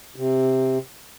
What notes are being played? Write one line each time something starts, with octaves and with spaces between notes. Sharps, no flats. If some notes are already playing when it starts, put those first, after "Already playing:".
C3